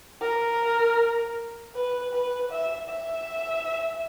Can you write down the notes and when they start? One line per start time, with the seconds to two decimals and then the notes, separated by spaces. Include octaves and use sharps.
0.21 A#4
1.75 B4
2.13 B4
2.51 E5
2.89 E5